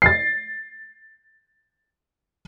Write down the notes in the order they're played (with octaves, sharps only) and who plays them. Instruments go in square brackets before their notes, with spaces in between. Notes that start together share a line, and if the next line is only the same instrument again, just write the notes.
[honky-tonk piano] A6 C7